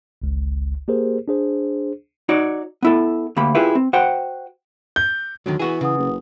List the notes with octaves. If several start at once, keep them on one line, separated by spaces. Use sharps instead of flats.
G1 C#2
A#3 G4 G#4 A#4 C5
D4 G#4 C5
D#4 F#4 C#5 D5
B3 E4 A4
D2 A#3 G4 B5
E4 F4 G4 G#4 B4 E5
C4
F#4 C5 F#5 G5
G6
D2 D3 D#3 F#3
E3 B3 F#4 G#4
C#3 B4 F#5 D#6
F#1